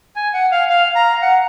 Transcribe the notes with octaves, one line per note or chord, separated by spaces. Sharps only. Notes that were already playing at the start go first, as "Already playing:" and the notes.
G#5
F#5
F5
F5
A#5
F#5